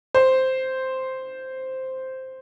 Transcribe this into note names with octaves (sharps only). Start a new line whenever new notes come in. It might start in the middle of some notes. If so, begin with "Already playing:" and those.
C5